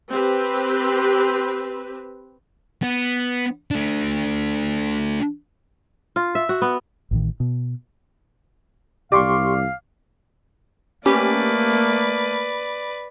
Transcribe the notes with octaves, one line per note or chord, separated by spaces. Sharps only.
C4 G4 B4
B3
A3 D4
F4
E5
F#4
B3
A1 A2 D#3
B2
C2 G4 D5 F5 C6 C#6
A3 A#3 C#4 G4 B4 D5